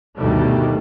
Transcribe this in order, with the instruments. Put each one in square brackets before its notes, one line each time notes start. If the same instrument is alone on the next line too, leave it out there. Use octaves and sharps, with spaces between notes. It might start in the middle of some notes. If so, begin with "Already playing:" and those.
[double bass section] D2 G2 B2 D#3 G3 A3